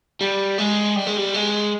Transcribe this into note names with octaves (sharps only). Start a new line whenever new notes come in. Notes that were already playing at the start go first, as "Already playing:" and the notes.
G3
G#3
G3
G#3
G3
G#3